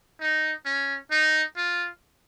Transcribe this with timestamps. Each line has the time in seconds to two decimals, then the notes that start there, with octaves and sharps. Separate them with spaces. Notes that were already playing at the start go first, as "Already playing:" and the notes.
0.20 D#4
0.65 C#4
1.11 D#4
1.57 F4